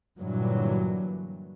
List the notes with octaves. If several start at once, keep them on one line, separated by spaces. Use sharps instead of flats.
G2 A#2 D3 E3 F#3